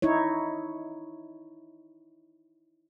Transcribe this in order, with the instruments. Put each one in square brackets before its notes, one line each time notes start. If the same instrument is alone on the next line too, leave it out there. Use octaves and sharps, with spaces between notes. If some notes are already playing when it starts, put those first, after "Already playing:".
[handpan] D#4 E4 C#5